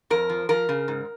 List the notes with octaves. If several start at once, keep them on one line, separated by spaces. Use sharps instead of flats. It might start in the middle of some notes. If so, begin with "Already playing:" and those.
F2 A#4
F3
F3 A#4
C#3
G#2